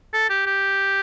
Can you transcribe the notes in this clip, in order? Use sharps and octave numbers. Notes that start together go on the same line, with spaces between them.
A4
G4
G4